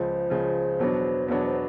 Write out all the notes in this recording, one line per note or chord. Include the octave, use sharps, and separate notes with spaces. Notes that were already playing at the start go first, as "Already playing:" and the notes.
Already playing: C#2 C#3 F3 C5
C#2 C#3 F3
E2 B2 F#3 B3 D4
E2 B2 F#3 B3 D4 C#5
C5